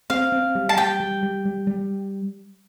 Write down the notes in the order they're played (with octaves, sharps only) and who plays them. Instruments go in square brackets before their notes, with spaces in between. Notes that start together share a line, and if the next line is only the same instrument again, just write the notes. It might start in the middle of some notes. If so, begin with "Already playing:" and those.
[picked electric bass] C4 [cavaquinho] F5
[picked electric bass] C4
G3
[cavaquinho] A5
[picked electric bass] G3 [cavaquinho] G5
[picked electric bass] G3
G3
G3
G3